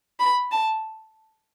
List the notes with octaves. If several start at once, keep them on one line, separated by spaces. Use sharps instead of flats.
B5
A5